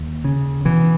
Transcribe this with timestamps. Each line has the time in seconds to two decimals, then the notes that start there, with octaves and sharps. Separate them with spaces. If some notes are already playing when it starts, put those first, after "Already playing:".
Already playing: D#2
0.24 C#3
0.65 B2 E3